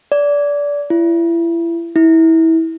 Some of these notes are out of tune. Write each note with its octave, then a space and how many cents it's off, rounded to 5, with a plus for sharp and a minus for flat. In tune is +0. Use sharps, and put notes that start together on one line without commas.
D5 -20
E4 +30
E4 -25